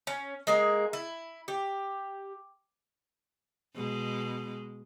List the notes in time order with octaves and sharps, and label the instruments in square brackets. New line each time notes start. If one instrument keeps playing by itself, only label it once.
[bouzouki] C#4
G#3 A#3 G#4
E4
G4
[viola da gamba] B2 G#3